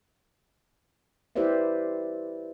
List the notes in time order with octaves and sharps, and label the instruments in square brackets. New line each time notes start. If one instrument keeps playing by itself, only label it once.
[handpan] E4 G4 B4 C5 D5 E5